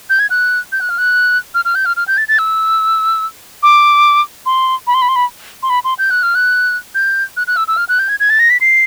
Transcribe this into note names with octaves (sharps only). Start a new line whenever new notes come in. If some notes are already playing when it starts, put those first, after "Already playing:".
G6
G#6
F#6
G6
F#6
F6
F#6
F6
F6
G6
F6
F6
G6
A6
A6
E6
D6
C6
B5
C6
B5
C6
B5
C6
B5
C6
G6
F#6
F6
F#6
G6
F#6
F#6
E6
E6
F6
F#6
G6
G#6
G#6
A6
A#6
B6
C7